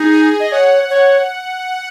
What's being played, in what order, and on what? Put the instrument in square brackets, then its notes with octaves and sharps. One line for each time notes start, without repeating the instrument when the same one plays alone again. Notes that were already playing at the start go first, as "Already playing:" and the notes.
Already playing: [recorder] D#4 [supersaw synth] G#4
[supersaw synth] G#4
[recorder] D#5
[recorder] C#5 [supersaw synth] F#5
[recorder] C#5